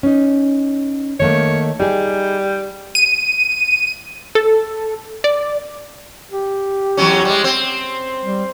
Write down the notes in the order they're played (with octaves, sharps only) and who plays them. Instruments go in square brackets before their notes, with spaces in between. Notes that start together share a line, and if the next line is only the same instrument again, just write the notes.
[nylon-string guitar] C#4 D#4
[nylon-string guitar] D#3 A3 A#3 [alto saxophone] C#5
[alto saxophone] G3 [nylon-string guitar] D#4 G#4
[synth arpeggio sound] D#7
A4
D5
[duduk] G4
[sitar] E2 F#3 C#4
G3 G#3
C4
[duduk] G3